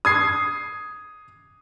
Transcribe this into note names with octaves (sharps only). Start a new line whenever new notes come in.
D#6 G#6 C7